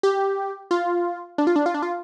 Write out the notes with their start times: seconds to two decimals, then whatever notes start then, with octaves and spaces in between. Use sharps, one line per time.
0.03 G4
0.71 F4
1.38 D4
1.47 F4
1.56 D4
1.66 F4
1.74 D4
1.82 F4